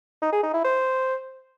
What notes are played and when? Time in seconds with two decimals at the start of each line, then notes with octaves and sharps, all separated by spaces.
0.22 D#4
0.32 G#4
0.43 D#4
0.54 E4
0.64 C5